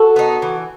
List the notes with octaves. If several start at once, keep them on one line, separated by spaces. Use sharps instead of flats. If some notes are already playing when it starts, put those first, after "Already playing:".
Already playing: F#4 A4
B3 D#4
E3